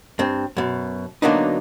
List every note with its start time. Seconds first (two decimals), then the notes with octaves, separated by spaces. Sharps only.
0.19 G2 C4
0.57 F#2 B2
1.22 D3 F#3 A#3 B3 D4 D#4